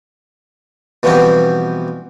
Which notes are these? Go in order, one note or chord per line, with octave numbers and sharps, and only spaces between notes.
B2 E3 F3 G3 B3 C4